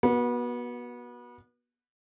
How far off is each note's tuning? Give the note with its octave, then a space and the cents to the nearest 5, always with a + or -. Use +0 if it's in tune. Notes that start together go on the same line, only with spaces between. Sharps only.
B3 -30 F#4 +0